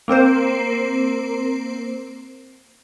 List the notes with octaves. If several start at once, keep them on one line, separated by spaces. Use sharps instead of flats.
A#3 C4 A#4 C5